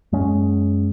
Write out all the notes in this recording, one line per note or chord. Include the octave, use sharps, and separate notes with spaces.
F#2 G#3 C#4